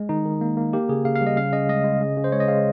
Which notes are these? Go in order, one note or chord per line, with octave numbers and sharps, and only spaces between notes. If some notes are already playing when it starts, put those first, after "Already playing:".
Already playing: G#3
D#3 D#4
D#3
A#3
A#3
A#3 G4
C#3 G#4
C#3 F5
F5
G3
D#5
C#3 F5
C#3 D#5
G#3 D#5
G#3
C#3
C#3
C5
G#3 C#5
D#5
G#3 F5